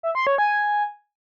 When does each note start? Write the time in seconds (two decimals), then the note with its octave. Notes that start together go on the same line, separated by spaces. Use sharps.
0.03 E5
0.15 C6
0.27 C#5
0.38 G#5